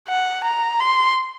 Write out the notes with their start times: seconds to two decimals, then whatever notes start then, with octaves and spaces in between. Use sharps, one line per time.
0.08 F#5
0.44 A#5
0.80 C6